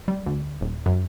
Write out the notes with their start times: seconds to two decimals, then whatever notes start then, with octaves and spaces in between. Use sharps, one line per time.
0.08 G3
0.26 D2
0.61 D#1
0.86 F#2